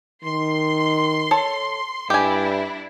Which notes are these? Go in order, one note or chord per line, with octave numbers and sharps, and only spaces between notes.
D#3 C6
A4 C#5
G2 D4 E4 G4 G#5